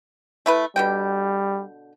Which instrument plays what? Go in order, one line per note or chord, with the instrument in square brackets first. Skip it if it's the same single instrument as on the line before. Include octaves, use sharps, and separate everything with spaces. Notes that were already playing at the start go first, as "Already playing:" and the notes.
[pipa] A3 E4 B4
[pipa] B2 D3 G5 [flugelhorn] G3